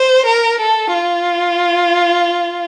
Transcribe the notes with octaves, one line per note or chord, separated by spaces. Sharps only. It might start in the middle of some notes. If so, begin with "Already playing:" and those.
Already playing: C5
A#4
A4
F4